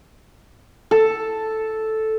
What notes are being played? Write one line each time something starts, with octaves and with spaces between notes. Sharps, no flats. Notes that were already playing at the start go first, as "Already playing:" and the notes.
A4